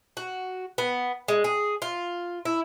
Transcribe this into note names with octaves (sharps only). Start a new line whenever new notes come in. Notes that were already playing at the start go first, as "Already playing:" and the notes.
F#4
B3
G#3
G#4
F4
E4